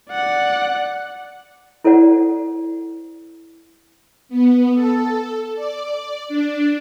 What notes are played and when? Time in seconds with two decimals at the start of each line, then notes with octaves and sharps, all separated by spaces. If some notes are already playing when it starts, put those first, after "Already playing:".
0.11 D5 F#5
1.84 E4 A4 C5 D5 F#5
4.29 B3
4.74 A4
5.56 D5
6.29 D4